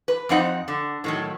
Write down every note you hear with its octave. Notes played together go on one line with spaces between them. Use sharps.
B4
F2 C4 D#4 F#5
D3
A2 D#3 F#3